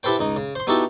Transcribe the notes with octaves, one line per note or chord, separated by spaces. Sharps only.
E4 G4 A4 B4 C5 G5
C#2 D#4 D#5
C#3
C5 C6
B3 D#4 E4 F#4 G4 A4